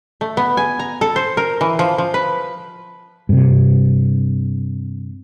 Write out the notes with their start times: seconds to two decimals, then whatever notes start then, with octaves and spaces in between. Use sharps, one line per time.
0.21 A3
0.37 B3
0.57 G#5
0.79 A#5
1.01 A4
1.16 C5
1.37 A#4
1.61 E3
1.79 F3
1.98 F3
2.14 B4
3.29 G2 C3